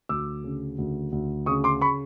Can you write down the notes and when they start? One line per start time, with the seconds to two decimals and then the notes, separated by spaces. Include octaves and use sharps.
0.09 D2 D6 E6
0.44 C#3
0.78 D2
1.12 D2
1.46 C#3 C#6 D#6
1.64 C6 D6
1.81 B5 C#6